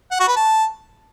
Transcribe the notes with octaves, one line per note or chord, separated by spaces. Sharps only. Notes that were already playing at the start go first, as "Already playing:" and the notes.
F#5
F#4
B4
A5